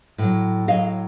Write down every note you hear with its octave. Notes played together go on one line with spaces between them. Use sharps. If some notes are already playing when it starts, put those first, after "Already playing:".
A2 F#3
A2 F#3 D#5 F5